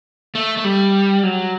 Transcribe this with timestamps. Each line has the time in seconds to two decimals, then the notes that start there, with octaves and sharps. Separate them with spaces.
0.35 A3
0.57 A3
0.64 G3
1.23 F#3